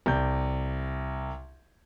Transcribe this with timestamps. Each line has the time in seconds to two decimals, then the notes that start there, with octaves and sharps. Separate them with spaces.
0.06 C2 D5 G6